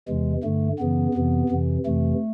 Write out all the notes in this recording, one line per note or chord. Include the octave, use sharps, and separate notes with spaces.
E2 C3 E3 G#3
G2 D3 A3
F#2 C#3 E3 B3
F2 C3 E3
F2 C3 E3
F2 C3 E3 A3